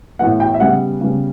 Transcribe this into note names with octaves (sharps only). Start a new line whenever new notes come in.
A2 E3 B3 F#5
G5
E5
C#3 G3 B3 F#5
C#3 G3 B3